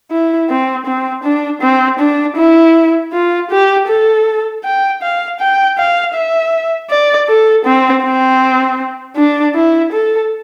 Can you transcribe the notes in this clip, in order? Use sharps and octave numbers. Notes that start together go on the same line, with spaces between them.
E4
C4
C4
D4
C4
D4
E4
F4
G4
A4
G5
F5
G5
F5
E5
D5
A4
C4
C4
D4
E4
A4